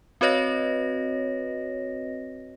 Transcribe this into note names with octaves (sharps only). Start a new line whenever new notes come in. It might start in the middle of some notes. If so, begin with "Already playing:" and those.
C4 F#4 B4 C#5 D#5 A#6